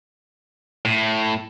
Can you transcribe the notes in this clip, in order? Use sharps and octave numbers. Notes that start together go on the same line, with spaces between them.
A2